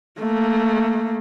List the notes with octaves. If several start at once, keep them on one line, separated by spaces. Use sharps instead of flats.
A3 A#3